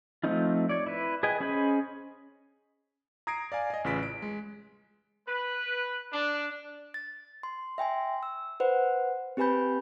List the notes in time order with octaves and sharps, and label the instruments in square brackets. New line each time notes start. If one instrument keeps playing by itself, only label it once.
[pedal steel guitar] F3 A3 C4 D#4 F4
C#5 D5
E4 B4
G#4 B4 D#5 G5 G#5
C#4 G#4 C5 D#5 B5
[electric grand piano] A#5 D#6 G#6 A#6 C7 D7
D5 F5 G#5
D#5 G#5
A1 C#3 F4 B4 B6 D7
D7
G#3
[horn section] B4
D4
[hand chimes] A6
C6
E5 G5 G#5 C6
E6
B4 C5 F#5
C4 G4 B4 G#5 B5 G6